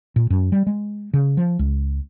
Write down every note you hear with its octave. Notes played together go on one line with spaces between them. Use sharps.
A#2
F#2
G3
G#3
C#3
F3
C#2